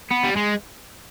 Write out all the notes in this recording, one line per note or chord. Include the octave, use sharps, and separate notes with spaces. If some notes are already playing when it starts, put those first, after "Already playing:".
B3
G3
G#3